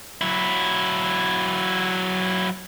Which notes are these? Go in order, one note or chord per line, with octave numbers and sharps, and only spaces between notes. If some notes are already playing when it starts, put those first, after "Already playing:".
F#3 E4